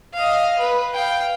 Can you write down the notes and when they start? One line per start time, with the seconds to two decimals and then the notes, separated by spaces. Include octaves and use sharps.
0.14 D#5 F5
0.59 B4
0.94 F5 G5